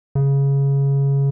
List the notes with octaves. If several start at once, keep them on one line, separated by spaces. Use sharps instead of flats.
C#3